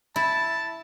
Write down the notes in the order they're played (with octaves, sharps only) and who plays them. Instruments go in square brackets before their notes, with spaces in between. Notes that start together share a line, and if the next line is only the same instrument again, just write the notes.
[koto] E4 [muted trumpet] A5